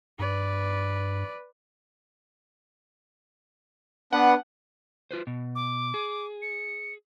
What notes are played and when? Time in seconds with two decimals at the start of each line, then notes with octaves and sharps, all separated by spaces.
0.19 G2 B4 D5
4.13 B3 D4 B4 F#5
5.11 F4 B4 C5
5.27 B2
5.55 D6
5.94 G#4
6.42 C#7